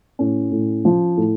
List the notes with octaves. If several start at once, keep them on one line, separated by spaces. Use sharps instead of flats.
A2 C#4
A2
F3
A2